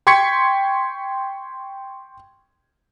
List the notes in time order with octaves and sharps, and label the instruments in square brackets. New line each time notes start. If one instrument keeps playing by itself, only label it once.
[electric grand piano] G5 C6 C#6 G#6 B6 C#7